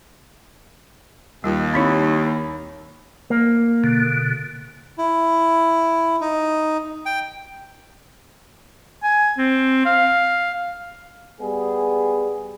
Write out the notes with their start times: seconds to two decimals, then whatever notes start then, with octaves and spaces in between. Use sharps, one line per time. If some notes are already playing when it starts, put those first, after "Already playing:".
1.44 D#2 G3 F4
1.74 C4 D#4 E4 C#5 B5
3.30 A#3
3.84 B2 D3
4.98 E4
6.21 D#4
7.06 G5
9.03 G#5
9.38 C4
9.86 F5
11.41 G3 B3 G#4